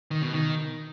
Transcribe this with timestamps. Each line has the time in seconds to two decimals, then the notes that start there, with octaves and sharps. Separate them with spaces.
0.11 D#3
0.22 B2
0.33 D#3